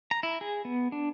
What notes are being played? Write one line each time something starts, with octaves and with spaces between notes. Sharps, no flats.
A#5
E4
G#4
B3
D4